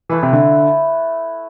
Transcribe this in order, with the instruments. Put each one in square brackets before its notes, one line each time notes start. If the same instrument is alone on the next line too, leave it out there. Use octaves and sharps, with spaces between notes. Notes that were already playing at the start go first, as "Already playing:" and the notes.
[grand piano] E3 [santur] A3 E4 B4
[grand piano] C3
D3